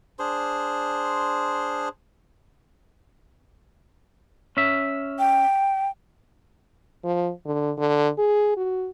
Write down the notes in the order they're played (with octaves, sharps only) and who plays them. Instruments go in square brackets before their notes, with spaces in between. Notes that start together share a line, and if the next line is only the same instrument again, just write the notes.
[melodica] D4 G#4 C5 C6
[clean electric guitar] C#4 E5
[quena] G5
[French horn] F3
D3
D3
G#4
F#4